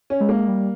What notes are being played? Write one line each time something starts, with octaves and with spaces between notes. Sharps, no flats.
C#4
G#3
A#3
G3